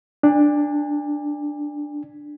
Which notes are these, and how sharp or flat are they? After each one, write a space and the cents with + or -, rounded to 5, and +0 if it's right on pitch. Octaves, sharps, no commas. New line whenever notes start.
D4 +5 G#5 -45